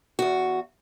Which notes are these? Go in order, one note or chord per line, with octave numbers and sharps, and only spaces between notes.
E2 F#4